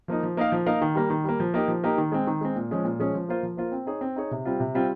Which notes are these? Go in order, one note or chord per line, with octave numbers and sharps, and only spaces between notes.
F3 A#3 D#4
F3
A#3 D#4 A#4 F5
F3
A#3 D#4 A#4 F5
D#3
G3 A#3
D#3
G3 A#3
F3
A#3 D#4 G4
F3
A#3 D#4 G4
D#3
G#3 C4
D#3
G#3 C4
A#2
F3 G#3 C#4 G#4
A#2
F3 G#3 C#4 G#4
F3
A#3 F4 C5
F3
A#3 F4 C5
C4
D#4 G#4 C#5
C4
D#4 G#4 C#5
C3
G3 C4 F4
C3
G3 C4 F4